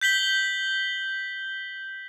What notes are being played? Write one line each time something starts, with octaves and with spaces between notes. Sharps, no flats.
G6 B6 F#7 G7